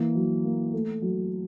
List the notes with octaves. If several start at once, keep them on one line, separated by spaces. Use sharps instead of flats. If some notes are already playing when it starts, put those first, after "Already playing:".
Already playing: E3 A#3
F#3
A#3
A3
F#3